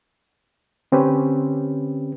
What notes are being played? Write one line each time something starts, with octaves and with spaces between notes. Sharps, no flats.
D3 C4 C#4 G4 B4